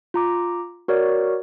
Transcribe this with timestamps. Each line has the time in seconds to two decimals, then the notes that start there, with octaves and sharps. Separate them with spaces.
0.14 F4 A#5 D6
0.88 F#4 A#4 C#5 D5